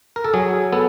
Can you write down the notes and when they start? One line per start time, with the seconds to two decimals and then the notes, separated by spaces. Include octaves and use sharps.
0.16 A#4
0.24 A4
0.34 F#3 G#4
0.72 B3 A4